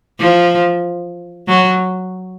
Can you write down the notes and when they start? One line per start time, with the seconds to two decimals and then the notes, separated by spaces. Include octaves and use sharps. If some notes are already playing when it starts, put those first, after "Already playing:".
0.20 F3
1.48 F#3